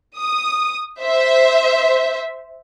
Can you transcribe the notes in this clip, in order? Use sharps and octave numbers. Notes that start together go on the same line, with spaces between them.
D#6
C5 E5